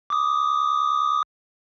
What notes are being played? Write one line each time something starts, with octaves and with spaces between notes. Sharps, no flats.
D6 D#6